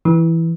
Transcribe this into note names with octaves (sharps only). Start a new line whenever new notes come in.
E3